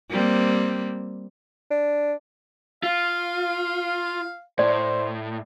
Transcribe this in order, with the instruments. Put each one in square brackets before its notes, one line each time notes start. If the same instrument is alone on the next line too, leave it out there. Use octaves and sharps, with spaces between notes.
[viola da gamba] G3 A#3 C4
[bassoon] D4
[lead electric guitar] F4 [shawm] F5
[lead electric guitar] A2 [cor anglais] C5 [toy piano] D5